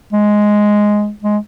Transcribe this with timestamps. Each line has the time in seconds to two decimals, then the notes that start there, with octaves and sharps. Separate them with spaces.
0.13 G#3
1.23 G#3